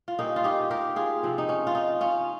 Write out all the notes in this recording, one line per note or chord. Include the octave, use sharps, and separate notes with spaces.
F4
A#2 G3 A#3 C#4 D#4
F4
D#4 G4
G4 A#4
F4 G#4
C3 F3 C4
D#4
C#4
F4
D#4
C#4 F4